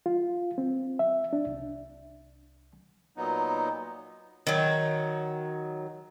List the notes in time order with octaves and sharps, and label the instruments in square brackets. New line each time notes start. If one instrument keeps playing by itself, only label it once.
[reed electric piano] F4
C4
E5
D4
C2
[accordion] A#2 F#3 B3 D#4
[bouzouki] D#3 F#3